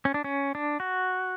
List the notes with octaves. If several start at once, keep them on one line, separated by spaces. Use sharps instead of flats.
C#4
D4
C#4
D4
F#4